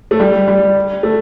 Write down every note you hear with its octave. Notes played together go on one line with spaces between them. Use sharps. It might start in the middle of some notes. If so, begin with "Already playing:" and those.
A3
G3
G3
A3